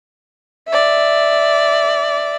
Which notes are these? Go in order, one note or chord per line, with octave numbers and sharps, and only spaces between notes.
D5 E5